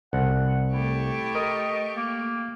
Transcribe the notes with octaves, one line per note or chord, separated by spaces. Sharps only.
C2 F#5
A3 E4 G4 C#6
A#4 D#5
A#3